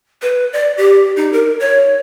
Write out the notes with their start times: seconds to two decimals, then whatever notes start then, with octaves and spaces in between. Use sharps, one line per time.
0.22 B4
0.53 D5
0.78 G4
1.16 D#4
1.33 A#4
1.60 C#5